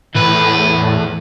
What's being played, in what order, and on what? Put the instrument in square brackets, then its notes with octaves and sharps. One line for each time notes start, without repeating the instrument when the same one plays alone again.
[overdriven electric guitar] E2 B4 [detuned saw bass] A2